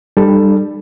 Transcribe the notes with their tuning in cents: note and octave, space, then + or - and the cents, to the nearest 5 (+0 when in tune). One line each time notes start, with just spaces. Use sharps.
G3 +15 D4 +45 A4 +0